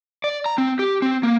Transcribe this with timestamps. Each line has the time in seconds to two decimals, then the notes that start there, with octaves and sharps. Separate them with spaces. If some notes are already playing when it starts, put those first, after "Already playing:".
0.24 D5
0.46 A#5
0.58 C4
0.79 G4
1.02 C4
1.23 A#3